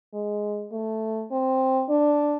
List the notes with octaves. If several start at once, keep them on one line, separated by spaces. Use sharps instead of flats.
G#3
A3
C4
D4